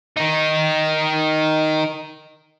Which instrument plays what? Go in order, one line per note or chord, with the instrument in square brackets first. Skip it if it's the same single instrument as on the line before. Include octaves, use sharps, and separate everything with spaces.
[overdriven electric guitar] D#3 D#4